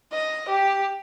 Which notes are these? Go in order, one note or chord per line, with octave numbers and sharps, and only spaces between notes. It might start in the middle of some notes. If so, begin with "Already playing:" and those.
D#5
G4